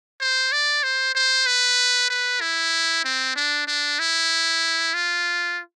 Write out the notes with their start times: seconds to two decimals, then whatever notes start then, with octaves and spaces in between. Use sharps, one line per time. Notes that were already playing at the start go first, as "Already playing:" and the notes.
0.21 C5
0.52 D5
0.83 C5
1.15 C5
1.46 B4
2.10 B4
2.41 E4
3.05 C4
3.36 D4
3.68 D4
3.99 E4
4.94 F4